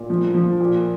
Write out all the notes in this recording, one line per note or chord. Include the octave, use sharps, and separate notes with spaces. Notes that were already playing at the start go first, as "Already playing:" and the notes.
Already playing: A#2
F3
F3
A#2